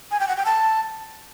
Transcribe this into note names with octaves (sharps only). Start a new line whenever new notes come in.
G#5
G5
F#5
G5
A5